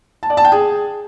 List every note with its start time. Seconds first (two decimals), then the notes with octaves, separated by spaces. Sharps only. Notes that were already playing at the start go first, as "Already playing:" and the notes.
0.23 A5
0.30 D5
0.37 A5
0.45 G5
0.52 G#4